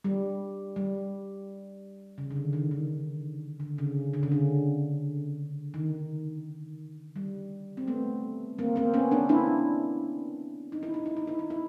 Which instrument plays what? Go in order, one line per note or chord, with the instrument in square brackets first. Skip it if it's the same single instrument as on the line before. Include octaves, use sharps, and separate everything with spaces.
[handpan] G3
G3
C#3
D3
D#3
D#3
D#3
D3
C#3
D3
C#3
D3
D#3
G3
C4
A3 B3
A#3 C4
A#3 C4
B3 C#4
C4 D4
D4 E4
D#4
E4
D#4
E4
D#4
E4
D#4
E4